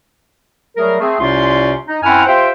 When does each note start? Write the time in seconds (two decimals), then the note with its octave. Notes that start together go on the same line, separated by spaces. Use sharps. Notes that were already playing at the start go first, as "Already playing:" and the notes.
0.77 F#3 G3 A3 G#4 A#4
1.00 A3 C4 G#4
1.20 C2 C3 C#4 F4 D5 C6
1.88 D#4
2.02 F#2 C4 E4 F#5 G#5 F6
2.26 F4 G4 C5 E5 F5 G5